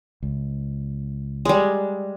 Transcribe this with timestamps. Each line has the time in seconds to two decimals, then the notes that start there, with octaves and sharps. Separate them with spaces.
0.22 C#2
1.45 G3 G#3